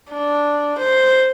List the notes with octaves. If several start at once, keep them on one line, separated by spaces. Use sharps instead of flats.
D4
C5